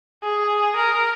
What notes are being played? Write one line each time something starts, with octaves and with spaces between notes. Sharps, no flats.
G#4
A#4